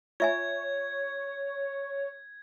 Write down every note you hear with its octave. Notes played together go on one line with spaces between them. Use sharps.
F4 C#5 E5 G#5 G#6